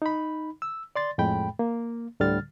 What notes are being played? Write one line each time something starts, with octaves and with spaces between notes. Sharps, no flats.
D#4 B5
E6
D5 C6 A6
F2 A2 G#3 G5 B5
A#3
D2 A2 D3 G3 F6 A6